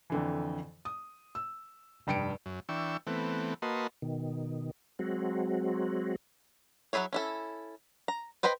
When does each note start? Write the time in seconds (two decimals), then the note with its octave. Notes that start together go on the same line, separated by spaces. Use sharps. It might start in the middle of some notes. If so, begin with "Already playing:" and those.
0.10 F2 D3 E3
0.85 D#6
1.35 E6
2.07 F1 G2 G5 C#7 D7
2.46 F#2
2.69 E3 D4 G5 C#6 E6
3.07 E3 A3 B3 C4
3.62 A#3 F#4 B4 D#5 A5 C6
4.02 B2 D#3
4.99 F#3 G#3 C4 F#4
6.93 F#3 A3 E4 G#4 C#5
7.13 C#4 E4 A4
8.08 A#5
8.43 B4 C5 D#5 G5 B5